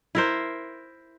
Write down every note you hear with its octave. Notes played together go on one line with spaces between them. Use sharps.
E4 A#4 C5